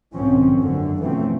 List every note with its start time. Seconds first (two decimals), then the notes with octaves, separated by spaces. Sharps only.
0.15 B1 G#2 D#3 F3 C4 C#4
0.59 F#1 F#2 D3
1.01 B2 E3 F3 A3 C4 C#4